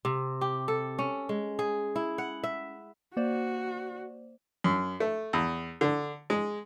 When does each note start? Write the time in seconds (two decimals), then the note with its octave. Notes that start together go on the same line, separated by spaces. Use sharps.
0.05 C3
0.41 G4
0.68 A4
0.99 C#4
1.29 G#3
1.59 G#4
1.96 E4
2.18 F#5
2.44 E5
3.17 A#3 F#4 C5 D5
4.64 F#2
5.00 A3
5.33 E2
5.81 D3
6.30 G#3